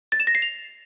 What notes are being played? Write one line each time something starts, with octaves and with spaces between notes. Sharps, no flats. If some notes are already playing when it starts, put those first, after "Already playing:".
A6
E7
A#6
C7
F7